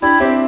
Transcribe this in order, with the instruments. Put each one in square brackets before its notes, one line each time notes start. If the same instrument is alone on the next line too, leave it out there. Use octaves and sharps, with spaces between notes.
[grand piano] D4 G4 [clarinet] E4
[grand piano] C4 E4 [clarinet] G4